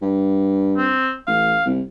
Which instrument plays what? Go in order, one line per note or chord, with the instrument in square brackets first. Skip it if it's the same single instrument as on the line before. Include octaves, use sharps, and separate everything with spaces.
[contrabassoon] G2
[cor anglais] C4
[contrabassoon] A1 [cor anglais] F5
[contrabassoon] C2